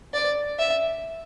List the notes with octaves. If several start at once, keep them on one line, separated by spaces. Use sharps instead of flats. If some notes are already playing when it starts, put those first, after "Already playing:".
D5
E5